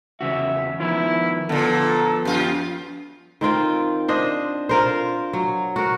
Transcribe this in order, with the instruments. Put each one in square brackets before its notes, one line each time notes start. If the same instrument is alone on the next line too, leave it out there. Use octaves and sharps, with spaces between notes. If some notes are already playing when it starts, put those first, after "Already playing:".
[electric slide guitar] E2 C#3 F#4 [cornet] E5
[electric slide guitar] D#3 F3 B3 [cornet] E4
[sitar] A#2 D3 [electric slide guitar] F3 B3 [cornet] A4
[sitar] F#2 F4
[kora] D#3 C4 F4 G5
D4 C5 D#5
F4 A#4 C5
F#3
F#4 A#4